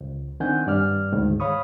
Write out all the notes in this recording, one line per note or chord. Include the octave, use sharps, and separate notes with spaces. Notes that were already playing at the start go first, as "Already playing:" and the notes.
C#2
D#3 C4 D4 F#5 G#5 G6
G2 D5 F6
D2 G#2 D#3
C#5 F5 B5 C#6 D#6